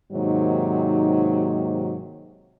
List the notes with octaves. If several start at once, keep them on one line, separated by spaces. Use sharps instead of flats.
G#2 C3 D#3 F#3 A#3 D#4